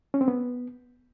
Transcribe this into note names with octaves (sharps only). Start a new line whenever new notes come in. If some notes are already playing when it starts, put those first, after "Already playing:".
C#4
C4
B3